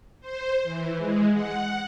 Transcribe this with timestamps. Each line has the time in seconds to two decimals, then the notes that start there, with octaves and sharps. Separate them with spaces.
0.21 C5
0.63 E3
0.98 G#3
1.33 F#5